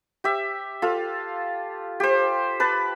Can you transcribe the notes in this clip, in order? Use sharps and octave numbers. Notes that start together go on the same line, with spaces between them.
G4 E5
F4 A4
G4 C5
B4 A5